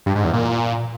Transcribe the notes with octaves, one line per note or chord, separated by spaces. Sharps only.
G2
G#2
E2
A#2